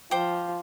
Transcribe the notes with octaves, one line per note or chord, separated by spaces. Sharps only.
F3 C5 G5 D6